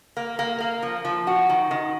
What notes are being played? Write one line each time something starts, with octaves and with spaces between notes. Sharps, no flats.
A#3
A#3
A#3
F3
F3
F#4
D#3
D#3